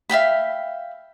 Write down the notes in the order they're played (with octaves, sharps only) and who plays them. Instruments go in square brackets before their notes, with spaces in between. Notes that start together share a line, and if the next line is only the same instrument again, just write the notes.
[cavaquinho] E5 F5 G5 B5